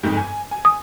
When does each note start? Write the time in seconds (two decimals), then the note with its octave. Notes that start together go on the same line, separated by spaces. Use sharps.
0.03 G1 F2 G#2
0.17 G#5
0.51 G#5
0.65 D#6